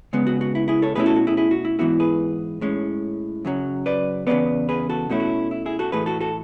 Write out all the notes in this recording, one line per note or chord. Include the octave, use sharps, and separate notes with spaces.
C#3 G#3 B3
F#4
F#4
E4
E4 G#4
A4 C#5
B2 A3 C#4 E4 G#4 B4
F#4 A4
F#4
E4 G#4
E4 G#4
F#4
E4
G#2 E3 B3 E4 F#4
G#4 B4
A2 G#3 C#4
F#2 C#3 F#3
B4 D5
E2 C#3 G#3 B3 B4 D5
G#4 B4
F#4 A4
B2 A3 C#4 E4 F#4
F#4
E4
E4 G#4
F#4 A4
A2 E3 A3 G#4 B4
F#4 A4
F#4 A4